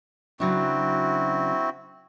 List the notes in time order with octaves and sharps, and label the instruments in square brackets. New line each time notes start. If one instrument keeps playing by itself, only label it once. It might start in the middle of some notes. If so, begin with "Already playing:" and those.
[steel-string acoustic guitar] C#3 F#3 D4 [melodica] C4 E4 F#4